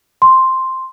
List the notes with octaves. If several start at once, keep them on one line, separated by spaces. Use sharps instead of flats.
C6